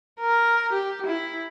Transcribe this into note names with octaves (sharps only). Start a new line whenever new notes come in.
A#4
G4
E4